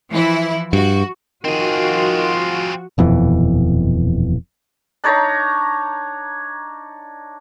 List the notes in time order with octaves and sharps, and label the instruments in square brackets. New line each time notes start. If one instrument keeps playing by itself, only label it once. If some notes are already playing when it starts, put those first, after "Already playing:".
[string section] E3 F3 E4
[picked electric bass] G2 [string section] F#4
[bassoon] D#3 [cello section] F3 F#4 [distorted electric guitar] C4 G#4 [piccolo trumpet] F4
[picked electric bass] D#1 F2 B2 E3
[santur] D4 D#4 C#5 A#5